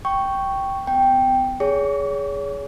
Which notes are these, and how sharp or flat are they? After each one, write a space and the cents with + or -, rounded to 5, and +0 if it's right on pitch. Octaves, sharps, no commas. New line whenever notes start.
G5 -5 C#6 +0
B3 +40 G5 +0
G#4 +0 C#5 +30